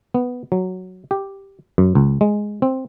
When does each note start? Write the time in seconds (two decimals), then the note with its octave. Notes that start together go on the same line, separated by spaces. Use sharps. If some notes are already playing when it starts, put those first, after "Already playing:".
0.14 B3
0.52 F#3
1.11 G4
1.78 F#2
1.95 C#2
2.21 G#3
2.62 C4